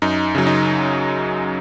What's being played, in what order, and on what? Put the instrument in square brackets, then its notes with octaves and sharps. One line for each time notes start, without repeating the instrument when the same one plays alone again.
[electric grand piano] F#2 D#4
C#3 F#3
D#4